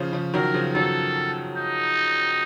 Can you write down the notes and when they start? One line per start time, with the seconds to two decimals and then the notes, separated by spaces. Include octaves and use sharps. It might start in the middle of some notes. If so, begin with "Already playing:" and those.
Already playing: C#3 F3
0.13 C#3 F3
0.34 D#3 F#3 A#4
0.54 C#3 F3
0.75 D#3 F#3 A4
1.57 D#4